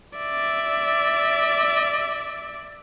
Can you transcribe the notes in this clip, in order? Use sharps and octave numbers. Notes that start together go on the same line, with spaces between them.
D5 E5